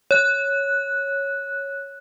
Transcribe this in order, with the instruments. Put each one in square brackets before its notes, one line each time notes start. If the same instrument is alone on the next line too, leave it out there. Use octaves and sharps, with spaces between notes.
[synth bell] C#5 F#6